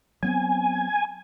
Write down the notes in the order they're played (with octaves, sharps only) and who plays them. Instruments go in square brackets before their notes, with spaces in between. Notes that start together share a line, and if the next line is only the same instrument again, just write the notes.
[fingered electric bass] F#3 B3 C4 [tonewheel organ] G#5